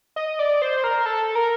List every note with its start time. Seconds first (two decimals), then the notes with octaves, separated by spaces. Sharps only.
0.16 D#5
0.39 D5
0.62 C5
0.84 A#4
1.06 A4
1.35 A#4